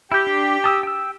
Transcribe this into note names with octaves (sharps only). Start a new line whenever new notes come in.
E4 G4 G6
D4
A5 D#6 E6
G5 E6